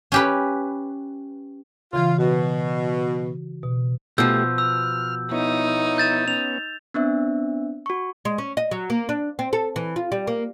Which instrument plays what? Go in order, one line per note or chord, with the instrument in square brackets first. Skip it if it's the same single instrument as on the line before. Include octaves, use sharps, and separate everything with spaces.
[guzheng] C#4 G4 B4
[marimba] C#3 E3 [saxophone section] F4
[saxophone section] B2 [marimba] F#4
[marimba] B2
[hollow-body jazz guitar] B2 F3 [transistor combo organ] A3 G4 [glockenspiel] E6 G6
[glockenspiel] E6 [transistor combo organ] F6
[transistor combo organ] B3 E4 C#5 [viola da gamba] D#4
[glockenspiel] G6 A6 E7
[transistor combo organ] B3 C#4 [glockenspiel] F7
[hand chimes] B3 C4 D4 E5
F#4 C#6
[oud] G#3
C#4
D#5
F#3
A#3
D4
C4
A4
E3
F4
G3
A#3